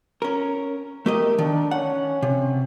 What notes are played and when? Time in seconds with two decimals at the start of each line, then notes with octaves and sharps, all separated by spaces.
0.22 C#4 A#4
1.06 A3 G4 A#4 D#5
1.39 D#3 D4
1.71 C#4 F#5
2.22 C3 C#4